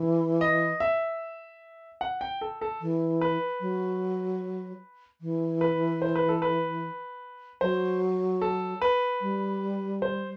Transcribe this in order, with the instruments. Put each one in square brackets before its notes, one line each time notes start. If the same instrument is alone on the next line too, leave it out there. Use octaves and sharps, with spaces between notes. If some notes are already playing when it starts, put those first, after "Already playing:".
Already playing: [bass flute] E3
[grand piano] D#5
E5
F#5
G5
A4
A4
[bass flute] E3
[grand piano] B4
[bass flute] F#3
E3
[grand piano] B4
C5
B4
A4
B4
[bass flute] F#3 [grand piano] C5
[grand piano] A4
B4
[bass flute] G3
[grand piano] C5